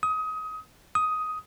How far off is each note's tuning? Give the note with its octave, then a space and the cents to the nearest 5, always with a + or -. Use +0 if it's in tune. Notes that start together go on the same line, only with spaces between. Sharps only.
D#6 +25
D#6 +10